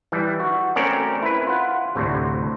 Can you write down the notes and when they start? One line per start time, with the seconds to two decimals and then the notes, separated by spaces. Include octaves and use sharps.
0.12 E3 G3
0.40 F#4
0.76 A3 C4 C#4 A#4 D5
1.23 E4 B4
1.47 F4 F#5
1.95 D2 A2 C3